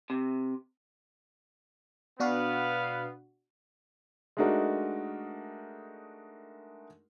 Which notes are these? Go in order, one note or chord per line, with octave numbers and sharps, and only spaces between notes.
C3
B2 B3 D4 F#4 B4 F5
G#3 A3 D4 D#4 F#4 A#4